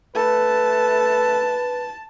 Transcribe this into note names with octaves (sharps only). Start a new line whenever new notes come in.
A3 B4 A5